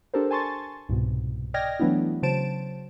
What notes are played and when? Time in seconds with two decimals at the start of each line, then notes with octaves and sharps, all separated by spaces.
0.14 D4 G4 A4 A#4 C5
0.31 G#5 A5 C6 C#6 A6
0.89 C2 G#2 B2
1.54 D5 D#5 G5 F6 G#6 A#6
1.80 E3 F#3 A3 B3 D4 E4
2.23 C#3 F#3 C5 A5 D7 E7